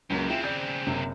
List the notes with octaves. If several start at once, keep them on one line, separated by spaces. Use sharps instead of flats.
C#2 F#2 F#3 A#3
C#3 C4 E4 F4 G5
D5 G6
F#1 F#2 C3